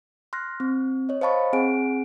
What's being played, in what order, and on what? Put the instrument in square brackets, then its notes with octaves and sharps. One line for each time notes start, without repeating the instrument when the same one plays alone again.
[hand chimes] C6 F6 F#6 A#6
C4
C#5 D#5
C5 D#5 F5 A5 B5 C#6
C4 G#4 F#5 G#5 D7